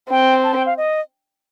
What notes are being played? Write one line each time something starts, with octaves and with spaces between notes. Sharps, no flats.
C4 G5
A5
G5
F5
D#5